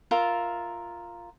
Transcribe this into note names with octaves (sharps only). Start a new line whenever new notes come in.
F4 A#4 E5